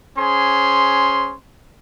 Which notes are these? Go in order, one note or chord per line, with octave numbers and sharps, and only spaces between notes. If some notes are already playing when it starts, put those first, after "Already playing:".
C#4 G#4 C5 C6